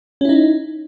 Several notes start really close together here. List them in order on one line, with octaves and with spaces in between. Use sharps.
C#4 E4 D#4